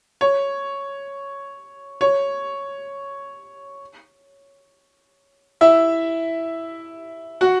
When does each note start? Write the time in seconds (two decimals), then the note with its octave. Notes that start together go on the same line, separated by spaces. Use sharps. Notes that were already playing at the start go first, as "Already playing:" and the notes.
0.21 C#5
2.01 C#5
5.61 E4 E5
7.41 F#4 F#5